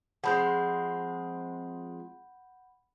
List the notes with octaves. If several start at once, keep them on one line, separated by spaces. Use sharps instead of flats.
F3 G#3 C4 F#5 B5 G6